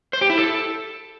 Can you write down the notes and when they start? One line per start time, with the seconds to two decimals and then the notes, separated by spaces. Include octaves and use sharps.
0.13 C5
0.21 G4
0.30 E4
0.38 A4